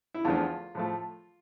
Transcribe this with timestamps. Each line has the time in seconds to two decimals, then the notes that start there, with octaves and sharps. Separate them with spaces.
0.14 E4
0.25 E2 D3 F3 A3 F4
0.75 A2 F3 A3